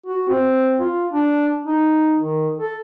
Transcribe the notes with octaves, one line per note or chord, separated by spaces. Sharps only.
F#4
C4
F4
D4
D#4
D#3
A4